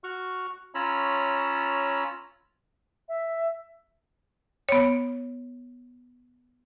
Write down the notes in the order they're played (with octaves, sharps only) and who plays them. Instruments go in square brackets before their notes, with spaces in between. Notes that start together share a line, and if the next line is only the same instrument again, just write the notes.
[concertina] F#4 C#6 F6
C#4 F4 C#5 A#5 B5 E6
[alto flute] E5
[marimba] B3 C#5